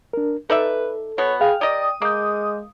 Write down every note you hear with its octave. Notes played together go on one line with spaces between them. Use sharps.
D4 A#4
D#4 A4 B4 D5 E5
B2 B3 C#5
G#4 F5 G5
G4 A#4 D5 D#5 D#6
G#3 A#3 D6 G6